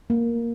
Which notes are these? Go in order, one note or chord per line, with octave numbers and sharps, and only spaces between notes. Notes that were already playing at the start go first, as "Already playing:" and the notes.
A#3